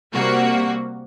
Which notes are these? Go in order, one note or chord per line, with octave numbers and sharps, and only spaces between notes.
C3 G3 A#3 F#4